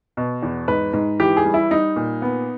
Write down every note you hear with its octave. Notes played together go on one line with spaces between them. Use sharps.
B2
E2
G#2 B4
G#2
E3 G4
G#4
G3
E4
G3 D#4
A#2
B3